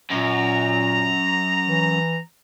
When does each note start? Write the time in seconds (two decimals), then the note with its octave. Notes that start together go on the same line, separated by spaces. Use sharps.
0.11 F#2 A#2 A#5
1.68 E3